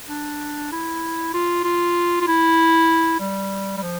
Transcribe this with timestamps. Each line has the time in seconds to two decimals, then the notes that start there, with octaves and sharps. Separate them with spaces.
0.09 D4
0.72 E4
1.34 F4
1.64 F4
2.21 F4
2.27 E4
3.20 G3
3.77 G3
3.83 F3